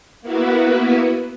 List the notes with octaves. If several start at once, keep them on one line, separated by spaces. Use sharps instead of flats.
A#3 B3 E4 F#4 B4